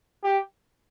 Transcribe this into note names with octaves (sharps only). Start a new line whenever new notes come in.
G4